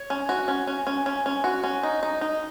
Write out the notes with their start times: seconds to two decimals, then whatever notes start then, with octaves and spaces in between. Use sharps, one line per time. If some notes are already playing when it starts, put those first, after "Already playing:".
Already playing: C#5
0.10 C#4
0.29 F#4
0.48 C#4
0.67 C#4
0.87 C#4
1.06 C#4
1.26 C#4
1.44 F#4
1.64 C#4
1.83 D#4
2.03 D#4
2.21 D#4